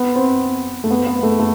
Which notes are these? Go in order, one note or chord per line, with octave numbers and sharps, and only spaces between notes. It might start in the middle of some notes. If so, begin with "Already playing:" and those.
Already playing: B3
C4
A3
B3
B3
A3
A3